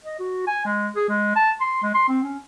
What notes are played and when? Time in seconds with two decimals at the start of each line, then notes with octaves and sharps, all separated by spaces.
0.04 D#5
0.20 F#4
0.47 G#5
0.66 G#3
0.96 G#4
1.09 G#3
1.36 A5
1.61 C6
1.83 G#3
1.95 C6
2.08 C4
2.23 C#4